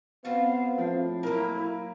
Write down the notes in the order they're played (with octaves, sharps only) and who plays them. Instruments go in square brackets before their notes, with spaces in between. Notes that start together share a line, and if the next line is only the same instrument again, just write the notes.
[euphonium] B3 [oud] C4 F4 F#4 [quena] F5
[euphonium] A2 [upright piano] F3
[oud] F#3 A#3 [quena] E4 [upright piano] A#4